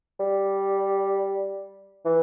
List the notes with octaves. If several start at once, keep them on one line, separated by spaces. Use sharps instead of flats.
G3
E3